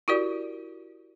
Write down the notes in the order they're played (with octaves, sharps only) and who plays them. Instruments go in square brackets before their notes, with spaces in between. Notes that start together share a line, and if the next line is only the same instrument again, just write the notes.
[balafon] E4 F#4 G4 A#4 D5